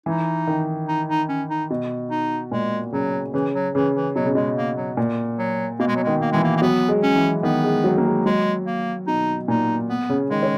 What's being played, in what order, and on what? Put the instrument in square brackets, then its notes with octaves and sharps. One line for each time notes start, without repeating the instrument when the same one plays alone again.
[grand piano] E3 [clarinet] D#4
[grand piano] D#3
[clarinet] D#4
D#4
C#4
D#4
[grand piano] B2
[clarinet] D#4
[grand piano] A#2 [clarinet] G#3
[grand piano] C#3 [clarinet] F#3
[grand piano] C#3 [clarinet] E3
[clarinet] F#3
[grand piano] C#3 [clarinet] E3
[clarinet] E3
[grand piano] B2 [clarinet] F#3
[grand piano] C#3
[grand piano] B2 [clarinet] G#3
[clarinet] A#3
F#3
[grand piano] A#2
[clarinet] F#3
[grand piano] B2 [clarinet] A#3
[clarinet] G#3
F#3
[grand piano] D#3 [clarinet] G#3
[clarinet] A#3
[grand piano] E3 [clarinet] G#3
[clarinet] A#3
A#3
[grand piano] F#3 [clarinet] B3
[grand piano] G#3
[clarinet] C#4
[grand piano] E3
[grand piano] D#3 [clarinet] B3
[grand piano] G#3
F#3
A#3
G#3
[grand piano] F#3 [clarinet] G#3
[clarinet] A#3
[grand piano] B2 [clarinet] D#4
[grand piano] A#2 [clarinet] D#4
[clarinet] B3
[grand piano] C#3
[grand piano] D#3 [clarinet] G#3
[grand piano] C#4